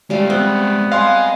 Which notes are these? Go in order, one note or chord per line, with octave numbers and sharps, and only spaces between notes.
G3 G#3 E5 F5
B3 C4
D#5 F5 G#5 C6